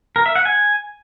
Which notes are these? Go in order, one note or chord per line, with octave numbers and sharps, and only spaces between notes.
A#4
E5
F#5
G#5